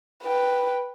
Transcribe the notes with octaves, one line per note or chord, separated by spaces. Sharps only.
B4 G5